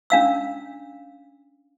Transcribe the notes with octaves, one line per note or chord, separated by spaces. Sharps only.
C#4 D4 F5 E6